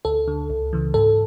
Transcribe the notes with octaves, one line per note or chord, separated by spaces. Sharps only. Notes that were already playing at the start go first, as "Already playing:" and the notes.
D2 A4
D3
C#2
C#3 E3
G#2 A4